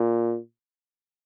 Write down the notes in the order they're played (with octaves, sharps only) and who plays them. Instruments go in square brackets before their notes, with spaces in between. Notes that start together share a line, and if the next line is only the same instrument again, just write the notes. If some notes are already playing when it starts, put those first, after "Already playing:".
Already playing: [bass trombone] A#2